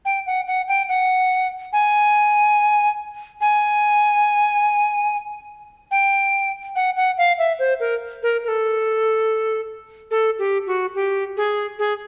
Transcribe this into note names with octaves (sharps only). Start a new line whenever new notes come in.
G5
F#5
F#5
G5
F#5
G#5
G#5
G5
F#5
F#5
F5
E5
C5
A#4
A#4
A#4
A4
A4
G4
F#4
G4
G#4
G#4